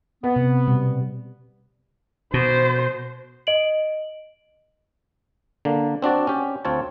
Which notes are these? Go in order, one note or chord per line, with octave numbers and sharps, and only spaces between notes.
B3 B4
C3
B2 G3
B2 C5
D#5 D7 F#7
D3 A#3
C4 D4 F#4 D5
C#4 G4
D2 C4 F4 C#5 A5